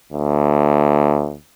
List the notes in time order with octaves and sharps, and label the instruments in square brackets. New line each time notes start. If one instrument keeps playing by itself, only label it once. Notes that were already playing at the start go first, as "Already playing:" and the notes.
[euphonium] D2